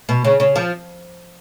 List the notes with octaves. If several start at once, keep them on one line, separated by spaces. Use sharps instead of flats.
B2
C#3
C#3
F3